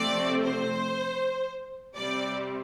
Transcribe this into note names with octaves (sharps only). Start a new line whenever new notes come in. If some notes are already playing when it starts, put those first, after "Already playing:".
Already playing: C3 F3 A3 C4 D5
C5
C3 G3 C4 D5